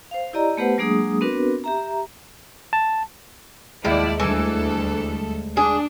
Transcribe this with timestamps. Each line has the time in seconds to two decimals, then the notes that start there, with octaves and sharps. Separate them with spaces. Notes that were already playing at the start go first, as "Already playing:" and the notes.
0.11 C5 F5
0.33 E4 G4 D5 D#5 A#5
0.57 A3 B3 G4 B4 C5 F#5
0.78 F#3 G#3 A#3 D4 G#4 D#6
1.21 B3 C4 D4 F#4 A#4 B4
1.64 G4 E5 A#5
2.73 A5
3.85 D#2 A2 F3 G#3 E4 D5
4.20 D2 E3 G3 A4
5.57 D4 G#4